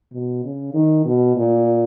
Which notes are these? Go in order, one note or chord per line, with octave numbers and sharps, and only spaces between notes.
B2
C#3
D#3
B2
A#2